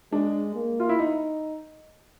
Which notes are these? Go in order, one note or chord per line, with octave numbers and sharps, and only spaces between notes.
G#3 D4
A#3
F4
E4
D#4